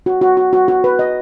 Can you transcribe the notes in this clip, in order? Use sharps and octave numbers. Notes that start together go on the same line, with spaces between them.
F#4
F#4
F#4
F#4
F#4
B4
D#5